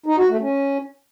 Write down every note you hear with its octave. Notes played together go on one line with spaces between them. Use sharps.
D#4
F#4
A3
C#4